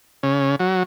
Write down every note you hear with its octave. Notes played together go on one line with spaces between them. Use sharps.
C#3
F#3